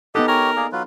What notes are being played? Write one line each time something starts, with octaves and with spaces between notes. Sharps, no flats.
B3 D#4 G4 A4 D#5 F#5
G4 A#4 C#5 G#5
A#3 G#4 D5
F#3 F4 B4